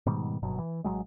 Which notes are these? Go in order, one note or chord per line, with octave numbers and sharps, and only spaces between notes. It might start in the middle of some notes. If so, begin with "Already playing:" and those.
G#2 B2 D#3 G3
F#1 G2 B2 F#3
E3
A1 C3 F#3 G#3